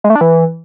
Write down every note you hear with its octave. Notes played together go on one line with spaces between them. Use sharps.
G#3
A3
D4
E3